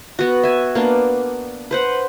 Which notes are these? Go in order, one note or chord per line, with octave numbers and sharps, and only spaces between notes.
B3 F#4
E5 G#5
A#3 B3 D4
B4 C5 F#5